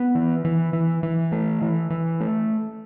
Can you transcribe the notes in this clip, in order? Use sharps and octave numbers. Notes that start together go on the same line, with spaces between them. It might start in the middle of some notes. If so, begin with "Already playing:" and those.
Already playing: B3
E3
E3
E3
E3
A3
E3
E3
A3